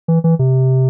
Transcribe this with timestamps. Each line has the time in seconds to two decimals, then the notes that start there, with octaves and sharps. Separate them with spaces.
0.08 E3
0.24 E3
0.39 C3